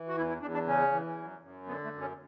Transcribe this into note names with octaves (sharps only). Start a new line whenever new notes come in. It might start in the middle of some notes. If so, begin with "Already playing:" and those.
Already playing: E3
F#4
E2 E4
E4
E2 D4
D4
C#3 C#4
E3
F#2
F#2
D3 B3
A3
F#2
C#4